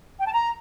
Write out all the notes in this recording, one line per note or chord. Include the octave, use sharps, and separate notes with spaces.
G5
A5
A#5